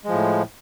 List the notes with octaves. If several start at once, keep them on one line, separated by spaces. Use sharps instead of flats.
A2 F3 G#3